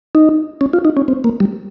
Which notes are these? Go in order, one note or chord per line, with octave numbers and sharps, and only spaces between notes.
D#4
C#4
F4
D#4
C#4
C4
A#3
G3